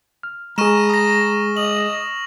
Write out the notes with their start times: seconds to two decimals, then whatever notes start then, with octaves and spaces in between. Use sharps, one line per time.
0.23 F6
0.58 G#3 G#4 A#5 C#6 F6 E7
0.90 D#6 A#6
1.57 D#5 F#7